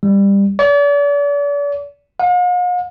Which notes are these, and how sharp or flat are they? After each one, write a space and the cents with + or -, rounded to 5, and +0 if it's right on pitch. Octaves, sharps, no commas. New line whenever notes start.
G3 +20
D5 -40
F5 +45